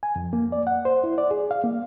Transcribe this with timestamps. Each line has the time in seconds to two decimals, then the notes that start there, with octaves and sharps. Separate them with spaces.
0.03 G#5
0.16 F2
0.33 A#3
0.52 D5
0.67 F#5
0.85 C5
1.04 E4
1.18 D5
1.31 G#4
1.51 F5
1.64 A#3